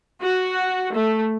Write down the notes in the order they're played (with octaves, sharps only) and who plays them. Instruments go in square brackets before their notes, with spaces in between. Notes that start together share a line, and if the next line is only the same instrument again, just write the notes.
[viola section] F#4
A3